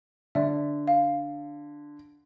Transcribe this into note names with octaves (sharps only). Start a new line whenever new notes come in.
D3 D5 E5
F5